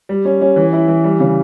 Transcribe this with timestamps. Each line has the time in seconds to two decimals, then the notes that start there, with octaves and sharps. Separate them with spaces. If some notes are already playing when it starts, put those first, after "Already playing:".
0.09 G3
0.25 C#4
0.41 C#4
0.56 E3
0.73 E4
0.88 E3
1.04 G3
1.20 C#3